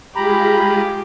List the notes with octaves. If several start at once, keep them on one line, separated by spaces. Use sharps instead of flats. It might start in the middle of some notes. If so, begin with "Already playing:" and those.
G#3 F4 G4 G#4 A#5 B5